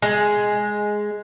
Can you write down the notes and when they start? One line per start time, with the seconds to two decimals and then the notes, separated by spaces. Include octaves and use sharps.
0.02 G#3